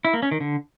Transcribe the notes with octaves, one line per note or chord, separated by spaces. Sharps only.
E4
A#3
C#4
D#3
D3